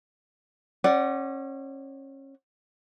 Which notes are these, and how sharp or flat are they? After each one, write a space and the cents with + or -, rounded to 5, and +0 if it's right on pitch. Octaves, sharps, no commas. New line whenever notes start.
C#4 -30 D5 +0 F#5 +15